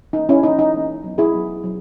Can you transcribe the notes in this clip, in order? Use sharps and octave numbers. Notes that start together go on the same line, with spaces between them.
E3 A#3 C#4 D#4
C#4 E4
E3 A#3 C#4 D#4
D#4
E3 A#3 C#4
F#3 B3
E4 G#4
F#3 B3
F#3